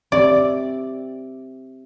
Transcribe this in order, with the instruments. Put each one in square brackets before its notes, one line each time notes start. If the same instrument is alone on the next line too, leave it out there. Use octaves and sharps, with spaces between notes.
[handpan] C4 G4 E5 [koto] D5